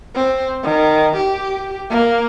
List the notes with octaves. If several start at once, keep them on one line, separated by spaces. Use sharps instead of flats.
C4
D#3
G4
A#3